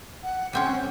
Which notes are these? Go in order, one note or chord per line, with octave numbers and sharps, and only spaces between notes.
F#5
G3 C4 C#4 F#5